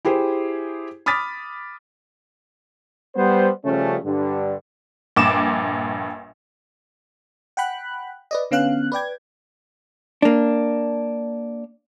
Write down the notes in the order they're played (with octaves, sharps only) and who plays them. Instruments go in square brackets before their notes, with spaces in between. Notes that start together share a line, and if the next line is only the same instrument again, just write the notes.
[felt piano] E4 G4 G#4 C5
B5 D6 D#6 F6 A6 B6
[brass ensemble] G3 B3 C5
C#3 F3 G3 A3 C#4
G2 D3
[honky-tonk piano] A#1 G2 D6 E7
[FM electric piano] F#5 G5 B5 F#6
B4 D5 D#5
D3 B3 C#4 F5 F#6
B4 D5 G5 G#6
[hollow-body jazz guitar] A#3 D4